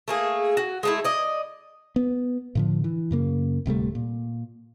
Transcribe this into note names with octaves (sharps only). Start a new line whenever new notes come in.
A3 A#3 G#4
F#4
G#3 A3 E4
D5 D#5
B3
A2 D3 F3
E3
F#2 C#3 A#3
D1 C3 G3 A3
A#2